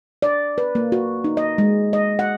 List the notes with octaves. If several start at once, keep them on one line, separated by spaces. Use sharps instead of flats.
D5
B4
A#3
F#4
D#4
D#5
G#3
D#5
F#5